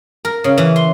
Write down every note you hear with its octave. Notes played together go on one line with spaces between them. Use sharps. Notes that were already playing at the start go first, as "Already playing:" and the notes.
A#4
C#3
E3
C6